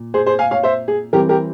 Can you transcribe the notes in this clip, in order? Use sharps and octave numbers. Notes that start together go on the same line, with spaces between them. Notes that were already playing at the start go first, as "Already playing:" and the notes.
Already playing: A#2
G#4 C5
G#4 C5
F5 G#5
C#5 F5
C5 E5
G#4
E3 G3 C4 G4 A#4
G4 A#4